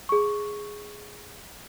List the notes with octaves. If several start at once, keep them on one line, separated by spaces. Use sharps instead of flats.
G#4 C#6